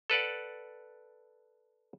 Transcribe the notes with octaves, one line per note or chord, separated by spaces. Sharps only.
A4 B4 D5 F#5